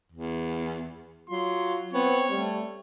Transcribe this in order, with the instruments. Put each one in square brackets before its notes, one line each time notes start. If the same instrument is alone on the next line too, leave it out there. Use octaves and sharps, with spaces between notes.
[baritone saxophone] E2
[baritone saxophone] F#3 [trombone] F4 [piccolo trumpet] C6
[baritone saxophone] B3 [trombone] C4 [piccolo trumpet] C#5
[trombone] G3 [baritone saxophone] A3